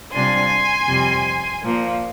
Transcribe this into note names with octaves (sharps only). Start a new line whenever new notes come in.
C3 G3 D4 F4 G#5 C6
F2 C3 G3
A#2 F3 A#3